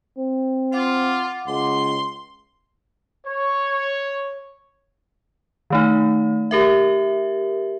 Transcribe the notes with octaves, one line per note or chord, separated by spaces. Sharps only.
C4
F4 F5 F#5 D6
C#2 C6
C#5
D#3 A3 D#4
G4 A#4 E5